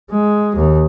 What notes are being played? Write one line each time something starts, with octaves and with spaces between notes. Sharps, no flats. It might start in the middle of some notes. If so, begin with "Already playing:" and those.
G#3
D#2